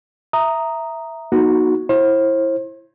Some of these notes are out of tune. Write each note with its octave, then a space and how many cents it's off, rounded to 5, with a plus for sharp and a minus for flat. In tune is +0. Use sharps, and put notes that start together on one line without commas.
E5 +0 A#5 +0 D#6 +0
B3 -45 D#4 +0 F#4 +0
E4 +0 C5 +40